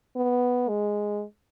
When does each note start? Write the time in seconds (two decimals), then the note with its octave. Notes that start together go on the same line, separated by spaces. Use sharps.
0.16 B3
0.69 G#3